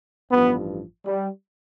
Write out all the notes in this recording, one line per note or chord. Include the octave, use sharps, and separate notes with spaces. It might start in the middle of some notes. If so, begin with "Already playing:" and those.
A1 G2 F3 B3
G3